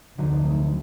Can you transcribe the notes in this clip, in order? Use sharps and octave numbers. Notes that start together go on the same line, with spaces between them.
F1 D2 D3 F#3 D#4